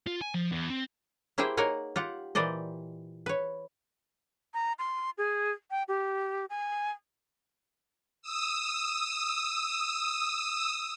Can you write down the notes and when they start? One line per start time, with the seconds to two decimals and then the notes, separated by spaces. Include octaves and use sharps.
0.07 F4
0.21 G#5
0.34 F3
0.52 E2
0.70 C4
1.38 A#3 E4 G4 G#4 C5 G5
1.57 A#3 D#4 A#4 C#5 F#5 G#5
1.96 F4 G4 F#5
2.35 A#2 E3 G4 C5 D5 D#5
3.26 B4 C#5
4.54 A#5
4.79 C6
5.18 G#4
5.71 G5
5.88 G4
6.50 G#5
8.22 D#6 E6